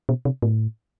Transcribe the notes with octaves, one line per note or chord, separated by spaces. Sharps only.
B2
C3
A2